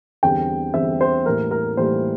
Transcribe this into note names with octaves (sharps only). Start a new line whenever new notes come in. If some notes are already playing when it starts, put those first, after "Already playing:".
E2 D3 G3 C4 G5
E2 D3 G3 C4 E5
C5
A2 E3 G3 A#3 A#4
A#4
A2 E3 G3 A#3 C5